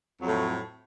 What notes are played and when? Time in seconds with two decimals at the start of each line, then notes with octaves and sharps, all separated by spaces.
0.19 F#3
0.22 F2
0.25 A2
0.27 A3